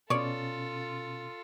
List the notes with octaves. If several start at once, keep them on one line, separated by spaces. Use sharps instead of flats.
B2 C#4 F4 A4 C#5 D5